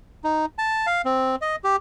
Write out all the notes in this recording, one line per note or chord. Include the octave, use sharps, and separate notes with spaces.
D#4
A5
F5
C4
D#5
G4